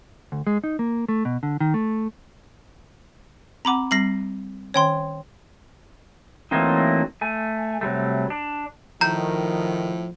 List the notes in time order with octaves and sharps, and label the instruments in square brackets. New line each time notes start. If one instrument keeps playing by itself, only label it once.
[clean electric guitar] D2
G#3
D#4
A#3
A3
B2
D3
D#3
A3
[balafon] C4 F#5 [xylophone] A#5 B5 D6
[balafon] G3 C4 [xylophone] A#6 C7 F#7
[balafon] D#3 C#4 G#5 [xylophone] C#5 G5 C6
[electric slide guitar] E3 F#3 A3 A#3 C4 D#4
A3 G#5
C3 F#3 G3 A3
D4
[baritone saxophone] A2 [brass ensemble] D#3 [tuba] F3 [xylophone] A#5 G6